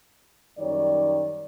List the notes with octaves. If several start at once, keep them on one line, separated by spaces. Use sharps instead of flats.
F#2 D#3 G3 C#5 D5